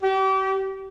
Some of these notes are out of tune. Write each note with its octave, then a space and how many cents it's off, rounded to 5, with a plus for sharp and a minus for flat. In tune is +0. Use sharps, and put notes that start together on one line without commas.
G4 -35